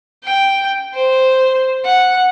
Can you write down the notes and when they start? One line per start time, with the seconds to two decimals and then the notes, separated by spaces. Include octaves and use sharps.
0.24 G5
0.94 C5
1.85 F#5